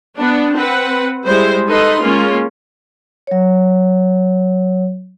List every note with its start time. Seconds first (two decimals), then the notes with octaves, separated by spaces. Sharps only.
0.17 B3 D4
0.54 C4 B4 F#5
1.25 G3 G#3 E4 C5
1.67 D#4 A4 B4 D#5 C6
2.01 G#3 A#3 C#4 F4
3.27 F#3 C#5